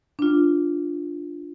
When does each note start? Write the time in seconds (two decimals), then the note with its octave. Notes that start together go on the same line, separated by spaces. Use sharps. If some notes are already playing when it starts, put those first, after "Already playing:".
0.19 D4 F4